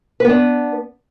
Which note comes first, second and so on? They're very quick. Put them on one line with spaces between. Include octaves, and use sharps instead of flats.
B4 B3 D4